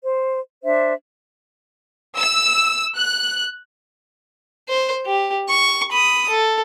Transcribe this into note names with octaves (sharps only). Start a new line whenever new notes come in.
C5
D4 C5 E5
E6
F#6
C5
G4
C#6
B5 D#6
A4